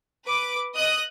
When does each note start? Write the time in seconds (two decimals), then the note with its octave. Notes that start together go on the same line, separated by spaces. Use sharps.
0.25 B4 D6
0.74 D#5 D#6 F#6